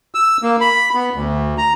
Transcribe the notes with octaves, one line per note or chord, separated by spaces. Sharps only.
E6
A#3
B5
B3
D2
A#5